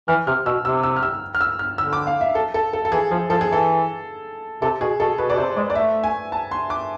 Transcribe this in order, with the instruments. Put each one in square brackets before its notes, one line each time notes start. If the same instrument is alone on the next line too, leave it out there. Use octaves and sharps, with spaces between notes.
[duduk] E3 [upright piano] F6
[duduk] C3 [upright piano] F6
[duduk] B2 [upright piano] E6
[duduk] C3 [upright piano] E6
[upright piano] E6
F6
E6
F6
E6
F6
[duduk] D3 [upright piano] E6
[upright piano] D6
F5
E5
A4
A4
A4
A4
[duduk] E3 [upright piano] G#4
[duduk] F3 [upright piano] G#4
[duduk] F3 [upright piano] A4
[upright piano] G#4
[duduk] E3 [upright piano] A4
[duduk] C3 [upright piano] A4
[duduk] B2 [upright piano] G#4
[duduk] B2 [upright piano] A4
[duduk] B2 [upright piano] B4
[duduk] B2 [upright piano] D5
[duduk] C3 [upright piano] C5
[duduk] G#3 [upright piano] D5
[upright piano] D5
[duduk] A3 [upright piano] E5
[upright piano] G#5
A5
C6
D6